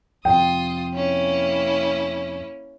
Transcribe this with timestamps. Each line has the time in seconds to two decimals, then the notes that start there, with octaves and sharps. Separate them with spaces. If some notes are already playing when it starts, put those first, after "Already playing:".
0.25 F2 C3 F4 G5 D#6
0.93 A#3 C#4 E4